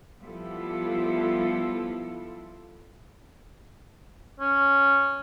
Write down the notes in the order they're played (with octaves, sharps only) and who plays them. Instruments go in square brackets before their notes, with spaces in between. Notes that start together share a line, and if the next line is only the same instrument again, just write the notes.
[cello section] F3 G3 B3 E4 F4 A4
[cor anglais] C#4